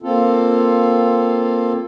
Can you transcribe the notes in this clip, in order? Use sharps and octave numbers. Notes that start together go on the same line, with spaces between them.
A#3 C4 F4 A4